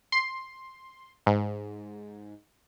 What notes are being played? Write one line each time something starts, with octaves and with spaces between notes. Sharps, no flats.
C6
G#2